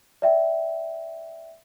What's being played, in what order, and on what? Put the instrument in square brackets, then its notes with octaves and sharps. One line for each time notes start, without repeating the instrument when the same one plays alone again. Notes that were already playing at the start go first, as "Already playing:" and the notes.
[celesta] D5 E5 G5